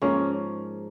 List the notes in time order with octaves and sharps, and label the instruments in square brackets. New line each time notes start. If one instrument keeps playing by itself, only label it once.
[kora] G#2 F3 A#3 [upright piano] C#4